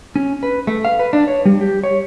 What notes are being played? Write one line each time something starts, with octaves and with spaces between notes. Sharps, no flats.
C#4
B4
A3
F5
B4
D4
C#5
G3
G4
C#5